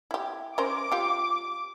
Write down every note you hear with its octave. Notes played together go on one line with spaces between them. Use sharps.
E4 G4
C#4 A#4 C5 D6
F4 G4